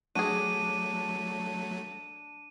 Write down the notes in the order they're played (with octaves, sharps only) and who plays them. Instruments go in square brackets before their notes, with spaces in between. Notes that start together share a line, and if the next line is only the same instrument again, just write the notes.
[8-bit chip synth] F#3 A3 [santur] D4 [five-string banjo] F#4 G#4 [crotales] D#7